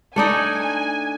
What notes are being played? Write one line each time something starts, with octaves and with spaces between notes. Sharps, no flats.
A3 D4 D#4 G#5